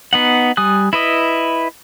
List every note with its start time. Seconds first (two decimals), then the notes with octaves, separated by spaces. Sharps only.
0.13 B3 D#4 F#5
0.57 G3 G#5 D#6 F#6
0.93 E4 B4 D#5